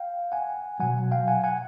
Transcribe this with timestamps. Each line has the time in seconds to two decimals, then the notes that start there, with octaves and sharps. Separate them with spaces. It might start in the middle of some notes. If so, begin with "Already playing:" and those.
Already playing: F5 G5
0.32 F#5 G#5
0.80 B2 F#3 F#5 G#5
1.12 F5 G5
1.28 F#5 G#5
1.44 F#5 G#5